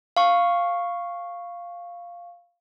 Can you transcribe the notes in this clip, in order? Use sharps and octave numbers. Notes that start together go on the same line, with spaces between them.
F5 C#6